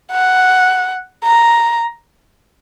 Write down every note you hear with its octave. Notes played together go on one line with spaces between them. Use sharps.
F#5
A#5